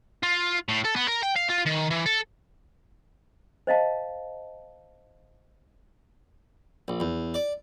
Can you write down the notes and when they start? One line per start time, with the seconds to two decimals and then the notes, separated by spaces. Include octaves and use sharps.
0.23 F4
0.68 A2
0.85 A4
0.96 B3
1.08 A#4
1.23 G5
1.36 F5
1.50 F4
1.66 D#3
1.90 E3
2.06 A4
3.67 C5 D#5 F5 A5
6.88 A#1
7.00 E2
7.34 D5